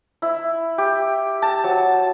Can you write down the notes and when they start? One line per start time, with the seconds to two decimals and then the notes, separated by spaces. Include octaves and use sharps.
0.22 E4
0.78 G4
1.42 A5
1.64 F#3